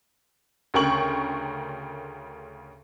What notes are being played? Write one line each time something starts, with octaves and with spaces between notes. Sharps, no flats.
D2 C#3 A#4 G5 C#6 F#7